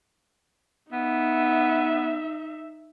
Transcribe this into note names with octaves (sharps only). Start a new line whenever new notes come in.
B3 D#4 E5